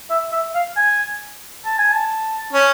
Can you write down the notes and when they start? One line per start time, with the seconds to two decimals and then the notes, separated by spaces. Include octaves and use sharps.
0.10 E5
0.32 E5
0.55 F5
0.76 G#5
1.65 A5
1.78 G#5
1.92 A5
2.53 C#4